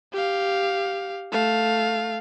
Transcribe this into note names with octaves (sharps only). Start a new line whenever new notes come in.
G4 F5
A3 F5